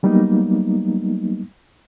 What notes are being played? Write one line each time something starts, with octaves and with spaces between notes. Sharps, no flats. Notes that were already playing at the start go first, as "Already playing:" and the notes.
F#3 G3 A#3 B3 D#4